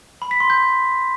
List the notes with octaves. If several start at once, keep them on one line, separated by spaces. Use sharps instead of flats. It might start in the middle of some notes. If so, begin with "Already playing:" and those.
B5
B6
C6
G6